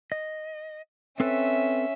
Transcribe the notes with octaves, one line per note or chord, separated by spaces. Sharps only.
D#5
C4 C#4 A4 B4 E5